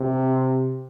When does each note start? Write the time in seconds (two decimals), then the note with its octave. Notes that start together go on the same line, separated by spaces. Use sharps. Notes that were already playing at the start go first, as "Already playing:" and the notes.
Already playing: C3